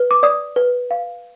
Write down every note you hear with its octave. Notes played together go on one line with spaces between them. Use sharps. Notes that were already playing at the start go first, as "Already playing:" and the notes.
Already playing: B4
D6
D5 D#6
B4
F5